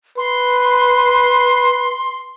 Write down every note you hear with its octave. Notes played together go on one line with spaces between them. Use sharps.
B4 C6